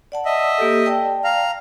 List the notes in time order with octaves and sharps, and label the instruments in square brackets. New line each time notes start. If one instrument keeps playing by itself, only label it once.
[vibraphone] D5 F#5 A5
[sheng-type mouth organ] D#5 E5
[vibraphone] A#3 G4 A4
D5 G5 A5
[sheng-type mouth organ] F5 A#5